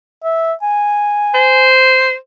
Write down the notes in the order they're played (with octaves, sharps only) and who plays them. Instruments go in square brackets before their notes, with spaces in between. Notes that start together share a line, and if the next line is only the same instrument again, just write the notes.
[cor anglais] E5
G#5
[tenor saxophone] C5